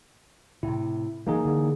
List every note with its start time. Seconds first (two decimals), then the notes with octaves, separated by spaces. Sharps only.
0.63 A2 C3 E4
1.27 E3 F#3 A#3 D#4 G#4
1.45 D3 E3